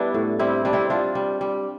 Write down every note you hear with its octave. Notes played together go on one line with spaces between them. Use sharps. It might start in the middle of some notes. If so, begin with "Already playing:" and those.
Already playing: G3 B3 D4 E4
A2
G3 C4 E4
G3 D4
C4 E4
G3 D4 F4
G3
G3